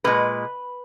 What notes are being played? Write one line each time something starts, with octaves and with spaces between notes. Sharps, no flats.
A#2 G#3 B4